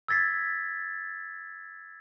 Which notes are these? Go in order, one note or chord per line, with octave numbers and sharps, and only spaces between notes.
E6 G#6 A6 B6 C7